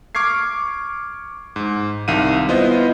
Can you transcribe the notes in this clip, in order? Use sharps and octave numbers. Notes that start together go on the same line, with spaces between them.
C#6 D6 F6 G#6 C7
G#2
C2 D#3 F5 D#7
B3 E4 F4 C5 D#5